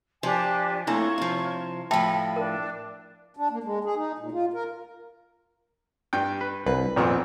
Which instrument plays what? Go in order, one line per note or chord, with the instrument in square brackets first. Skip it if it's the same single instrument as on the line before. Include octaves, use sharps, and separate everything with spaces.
[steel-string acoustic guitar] F3 [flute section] D4 G4 G#5
[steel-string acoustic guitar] A3 A#3 C4 [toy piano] D4 E4 [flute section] F4 C#5 C#6
[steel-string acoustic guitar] C3 F3
[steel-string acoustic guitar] A2 F3 [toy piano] E5 G5 A5 [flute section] B5
[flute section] D4 [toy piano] A#4
[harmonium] D4
A#3
G#3
G#4
D#4
A#2
F4
A#4
[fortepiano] G2 G5
[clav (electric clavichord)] B4
[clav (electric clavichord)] C2 [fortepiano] B4
[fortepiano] G#1 B3 C4 [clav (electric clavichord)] F2 A#2 D#3